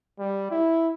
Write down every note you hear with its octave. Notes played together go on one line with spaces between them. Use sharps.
G3
E4